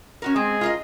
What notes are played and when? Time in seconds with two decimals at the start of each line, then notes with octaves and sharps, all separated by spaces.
0.22 C#4 F#4 A#4
0.36 G#3 C4 G#4
0.61 F4 A#4 D#5